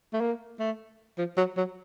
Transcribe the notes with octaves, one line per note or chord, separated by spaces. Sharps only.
A3
A#3
A3
F3
F#3
F#3